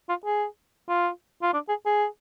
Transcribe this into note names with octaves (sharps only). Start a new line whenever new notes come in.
F4
G#4
F4
F4
D4
G#4
G#4